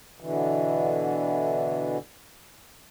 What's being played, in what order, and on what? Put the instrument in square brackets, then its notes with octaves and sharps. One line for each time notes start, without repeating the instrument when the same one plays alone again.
[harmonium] B2 D3 E3